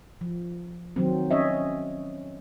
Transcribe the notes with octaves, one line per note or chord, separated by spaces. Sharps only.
F3
D#3 F#3 C4
C#4 C#5 D#5 E5